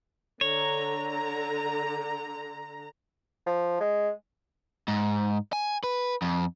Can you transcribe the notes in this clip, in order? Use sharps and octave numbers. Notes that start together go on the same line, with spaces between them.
D3 C#5 A#5
F3
G#3
G#2
G#5
B4
F2